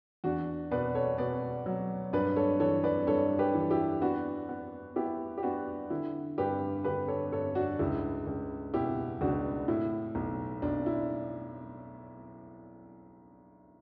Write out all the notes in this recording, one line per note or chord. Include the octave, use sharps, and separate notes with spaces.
E2 D4 F#4
B2 B4 D5
A4 C#5
B2 B4 D5
F#3
G2 B4 D5
A4 C#5
E3 A4 C#5
B4 D5
G2 A4 C#5
G4 B4
E3
E4 G4
B3 D4 F#4
B3
B3 E4 G4
G4
B3 D4 F#4
D3 E4
G2 G4 B4
D3 G4 B4
A4 C#5
G2 A4 C#5
D4 F#4
C#2 E4
C#2
B2 E4 G4
C#2 D4 F#4
A2 E4
B1
B1 D4
E4